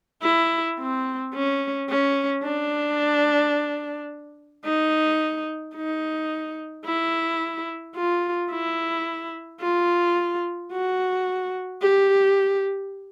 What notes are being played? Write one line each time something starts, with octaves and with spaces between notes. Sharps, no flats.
E4
C4
C#4
C#4
D4
D#4
D#4
E4
F4
E4
F4
F#4
G4